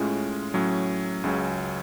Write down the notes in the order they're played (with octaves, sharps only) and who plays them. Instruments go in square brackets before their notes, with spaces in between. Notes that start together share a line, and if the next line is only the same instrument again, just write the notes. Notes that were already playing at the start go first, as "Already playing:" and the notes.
Already playing: [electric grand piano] A2 G#3 C#4 F4
A2 F#3 C#4
C#2 C#3 F#3 C#4